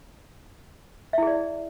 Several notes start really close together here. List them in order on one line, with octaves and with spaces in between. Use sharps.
E5 E4 G#4 D5